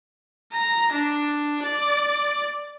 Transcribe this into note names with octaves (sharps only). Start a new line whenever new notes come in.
A#5
D4
D5